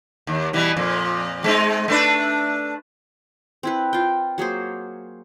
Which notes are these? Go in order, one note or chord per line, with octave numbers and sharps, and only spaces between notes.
D#2
B2 E3 G3
F2 A#2
G#3 C4 D#4
A3 D4 B4
C4 E4 B4
F4 G5
F#3 A#3 G#4 C5